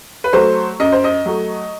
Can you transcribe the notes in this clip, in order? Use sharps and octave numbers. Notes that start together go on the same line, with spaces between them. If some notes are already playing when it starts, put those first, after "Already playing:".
B4
F#3 A3 C5
F#2 D#5
C5
D#5
F#3 A3